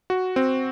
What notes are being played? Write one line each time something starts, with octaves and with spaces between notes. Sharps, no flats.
F#4
C4